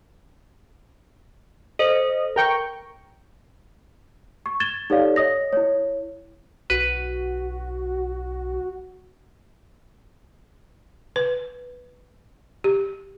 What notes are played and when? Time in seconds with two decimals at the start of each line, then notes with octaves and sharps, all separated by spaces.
1.79 A4 C5 D#5
2.36 A#4 G5 C#6
4.46 C#6
4.60 G#6 A6 E7 G7
4.90 D#4 G4 A4 C#5 D5 F5
5.16 C#5 D#5 D#6 A#6
5.53 E4 C#5
6.70 B1 F#4 B4
11.16 B4
12.64 G4